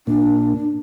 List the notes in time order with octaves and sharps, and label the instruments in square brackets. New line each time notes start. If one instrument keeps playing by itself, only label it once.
[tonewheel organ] A#2 [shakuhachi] D4